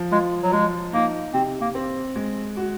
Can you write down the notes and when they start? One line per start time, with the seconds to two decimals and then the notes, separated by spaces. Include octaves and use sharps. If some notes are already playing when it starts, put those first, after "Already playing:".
Already playing: F3
0.11 G#3 F4
0.43 F#3
0.52 F3 G#3
0.93 A#3 D#4
1.33 C3 C4
1.61 A#3
1.75 C4
2.16 G#3
2.57 F#4